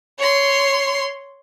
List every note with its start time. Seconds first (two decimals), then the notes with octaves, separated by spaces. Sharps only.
0.19 C#5 C6